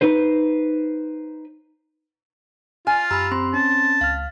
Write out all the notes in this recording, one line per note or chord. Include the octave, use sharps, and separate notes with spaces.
D#4 B4 C5
F4 G#5 F6
F#2 G4 A#5 B5 E6
C4 C6
C#4 A5
C#2 F5 F6